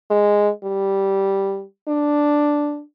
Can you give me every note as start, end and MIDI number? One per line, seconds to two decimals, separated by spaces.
0.10 0.49 56
0.64 1.63 55
1.88 2.81 62